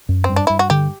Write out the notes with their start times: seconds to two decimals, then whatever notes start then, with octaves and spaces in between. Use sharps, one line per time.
0.09 F#2
0.24 G2 C4
0.36 D4
0.47 G2 E4
0.59 F#4
0.70 D3 G4